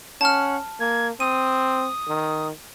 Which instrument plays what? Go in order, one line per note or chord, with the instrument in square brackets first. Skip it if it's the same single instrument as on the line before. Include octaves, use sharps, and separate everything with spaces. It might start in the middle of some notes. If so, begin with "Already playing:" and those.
[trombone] C#4 [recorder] F#5 [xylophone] A5 F6
[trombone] A#3 [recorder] G#6
[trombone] C4 [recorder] D#6 [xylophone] D#7
[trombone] D#3